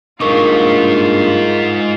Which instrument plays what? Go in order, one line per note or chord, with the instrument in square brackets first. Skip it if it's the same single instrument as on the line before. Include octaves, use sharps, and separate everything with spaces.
[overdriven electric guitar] G2 A#3 [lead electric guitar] G#3 D#4 [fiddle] F4 [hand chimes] A#4 C#6 D6